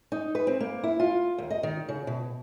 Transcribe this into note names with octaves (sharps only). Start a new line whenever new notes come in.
D#4
B4
C4
A#3
E4
F4
D#2
D#5
D#3
C#3
B2